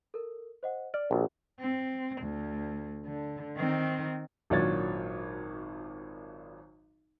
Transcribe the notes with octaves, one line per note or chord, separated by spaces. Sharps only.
A4 A#4
C5 D#5 F#5
D5 F6
A#1 F#4 G#4
C4
D2
D3
D#3 C4
G#1 A#2 F#3 D4 C#5 A6